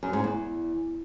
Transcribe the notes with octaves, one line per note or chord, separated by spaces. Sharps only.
F#2
G#2
E2